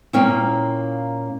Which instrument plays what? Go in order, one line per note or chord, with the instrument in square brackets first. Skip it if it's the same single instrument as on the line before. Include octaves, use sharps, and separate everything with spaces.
[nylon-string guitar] A#2 A#3 C#4 E4 G5